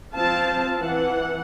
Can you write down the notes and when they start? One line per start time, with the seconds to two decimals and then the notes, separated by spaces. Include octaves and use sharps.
0.14 F3 C4 F5 A5
0.80 E3 F#5